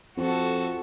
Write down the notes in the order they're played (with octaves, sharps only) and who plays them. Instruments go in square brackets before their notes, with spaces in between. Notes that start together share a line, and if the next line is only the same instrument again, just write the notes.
[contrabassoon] F2 [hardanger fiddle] F#4 A4